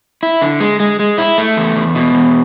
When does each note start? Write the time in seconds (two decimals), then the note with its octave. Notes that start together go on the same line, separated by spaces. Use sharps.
0.23 E4
0.42 D3
0.60 G#3
0.80 G#3
0.99 G#3
1.18 E4
1.38 A3
1.57 E2
1.76 E2
1.95 B2
2.14 E2